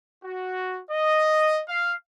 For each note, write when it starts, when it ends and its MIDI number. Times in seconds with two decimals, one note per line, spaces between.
0.24 0.80 66
0.90 1.61 75
1.68 1.94 77